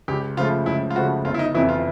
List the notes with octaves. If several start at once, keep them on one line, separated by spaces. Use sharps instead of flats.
C#2 G4
C#3 F3 A3 F4
C#2 E4
F4
C#3 F3 A3 F#4
G1 F4
E4
D#4
F2 C3 E3 E4
F4